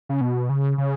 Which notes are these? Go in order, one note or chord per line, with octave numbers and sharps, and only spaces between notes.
C#3
B2
C#3
C#3